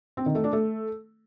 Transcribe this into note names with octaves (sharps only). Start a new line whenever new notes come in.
C4
D#3
A3
D4
A3